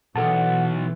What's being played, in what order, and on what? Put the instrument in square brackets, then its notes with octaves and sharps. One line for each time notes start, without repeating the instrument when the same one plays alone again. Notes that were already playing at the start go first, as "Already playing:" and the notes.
[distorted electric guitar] B1 [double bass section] E3 [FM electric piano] A4 A5 [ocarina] F#5